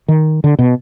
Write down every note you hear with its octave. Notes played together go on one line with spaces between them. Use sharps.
D#3
D3
B2